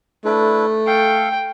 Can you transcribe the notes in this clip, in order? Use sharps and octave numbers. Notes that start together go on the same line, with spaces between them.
A3 D4 E4 B4
A4 F5 G5